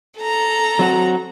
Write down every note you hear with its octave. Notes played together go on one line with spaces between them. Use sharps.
A4 A#5
F#3 C4 F#4